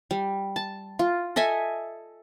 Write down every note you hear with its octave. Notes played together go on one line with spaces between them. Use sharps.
G3
A5
F4
A4 D#5 E5 G#5